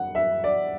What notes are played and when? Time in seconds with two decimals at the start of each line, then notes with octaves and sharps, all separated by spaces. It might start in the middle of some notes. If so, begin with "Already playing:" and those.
Already playing: F#5
0.15 E5
0.44 D5